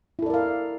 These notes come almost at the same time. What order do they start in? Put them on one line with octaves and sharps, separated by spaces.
E4 A4 D5 A#4 F5